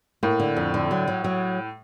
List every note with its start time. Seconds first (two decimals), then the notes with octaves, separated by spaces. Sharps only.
0.23 A2 A#3
0.40 D3
0.57 F2
0.74 D3
0.91 F#3
1.08 F#3
1.24 F#3